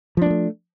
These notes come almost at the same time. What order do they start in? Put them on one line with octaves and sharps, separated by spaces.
F3 D4 A#3 A3